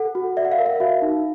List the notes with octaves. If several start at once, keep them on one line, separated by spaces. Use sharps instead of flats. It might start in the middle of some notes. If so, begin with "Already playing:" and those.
Already playing: A4 F#5
F#4
D5 E5
F#5
F5
A#4
E5
F#4 F5
D#4